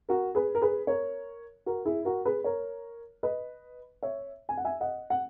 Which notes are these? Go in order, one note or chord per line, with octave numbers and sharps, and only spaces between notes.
F#4 A#4
G#4 B4
A#4
G#4 B4
A#4 C#5
F#4 A#4
E4 G#4
F#4 A#4
G#4 B4
A#4 C#5
B4 D#5
C#5 E5
G#5
F#5
E5 G#5
D#5 F#5
F#5